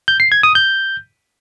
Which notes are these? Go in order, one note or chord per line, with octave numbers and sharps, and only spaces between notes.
G6
C7
G#6
D#6
G6